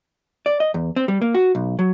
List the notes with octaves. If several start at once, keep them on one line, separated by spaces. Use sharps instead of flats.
D5
D#5
E2
C4
G3
A#3
F#4
B1
F#3